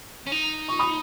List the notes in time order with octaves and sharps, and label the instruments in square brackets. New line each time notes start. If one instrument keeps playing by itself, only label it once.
[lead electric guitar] C#4
D#4
[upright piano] C#6
B5 D#6